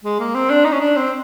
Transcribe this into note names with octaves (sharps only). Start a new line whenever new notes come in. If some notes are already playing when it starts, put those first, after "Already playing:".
G#3
A#3
C4
D4
D#4
C#4
D4
C4